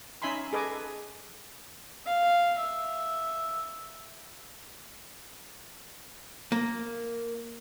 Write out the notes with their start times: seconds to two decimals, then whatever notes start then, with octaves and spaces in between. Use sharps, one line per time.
0.22 C#4 D#4 E5 G#5 B5 C6
0.53 G#4 A4 B4 D#5 G#5 D6
2.06 F5
2.57 E5
6.52 A#3